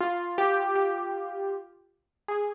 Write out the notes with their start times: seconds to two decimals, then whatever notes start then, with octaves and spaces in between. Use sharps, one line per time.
0.01 F4
0.38 G4
0.76 G4
2.28 G#4